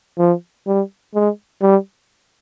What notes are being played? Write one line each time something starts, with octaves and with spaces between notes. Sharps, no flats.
F3
G3
G#3
G3